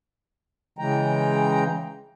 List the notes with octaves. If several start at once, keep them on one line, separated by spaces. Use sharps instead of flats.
C#3 E3 G#3 G5 A#5